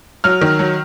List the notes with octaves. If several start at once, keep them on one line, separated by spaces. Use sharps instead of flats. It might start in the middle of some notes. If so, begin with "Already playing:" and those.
F#3 F6
D#3
F#3